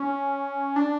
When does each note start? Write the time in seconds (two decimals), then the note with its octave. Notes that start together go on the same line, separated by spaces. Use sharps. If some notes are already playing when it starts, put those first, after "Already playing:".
Already playing: C#4
0.76 D4